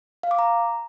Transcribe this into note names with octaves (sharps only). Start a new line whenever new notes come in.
F5
D6
A#5